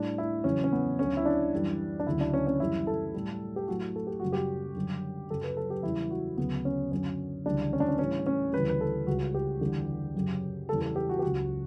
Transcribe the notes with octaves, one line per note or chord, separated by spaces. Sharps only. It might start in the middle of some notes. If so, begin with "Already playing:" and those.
Already playing: A2 G3 D4
E4
E2 C#3 F#3 C#4
C#4
B3
D2 D3 F#3 C#4
E4
D4
F#2 E3 G3
D4
D2 C#3 F#3 E4
D4
C#4
C#4
F#2 E3 G3 E4
A4
A2 G3
G4
A2 F#3 F#4
A4
G4
F#2 C#3 G3 F#4
G4
F#2 D3 G3
F#2 C#3 F#3 A4
B4
A4
G4
E2 C#3 G3 E4
F#4
D2 C#3 F#3 B3
C#4
F#2 D3 F#3 C#4
D2 C#3 E3 G3 D4
C#4
D4
C#4
A2 E3 G3 C#4
C#4
D2 C#3 E3 G3 B4
B4
A4
C#2 C#3 G3 F#4
G4
E2 D3 G3
F#2 C#3 F#3
E2 C#3 E3 G3 A4
A4
G4
F#4
G4
C#2 C#3 F#3 F#4